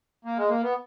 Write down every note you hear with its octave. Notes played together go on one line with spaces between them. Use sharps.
A#3
G#3
A#3
B3